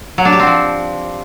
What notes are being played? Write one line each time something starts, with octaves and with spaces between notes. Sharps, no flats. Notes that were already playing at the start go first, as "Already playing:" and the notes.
F#3
D4
G4
C4
F3